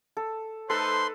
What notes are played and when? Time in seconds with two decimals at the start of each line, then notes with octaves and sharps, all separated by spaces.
0.17 A4
0.70 A3 D#4 A4 B4 C5 C6